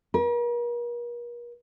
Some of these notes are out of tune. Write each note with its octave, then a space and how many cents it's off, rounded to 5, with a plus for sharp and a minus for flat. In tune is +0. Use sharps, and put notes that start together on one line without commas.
A#4 +40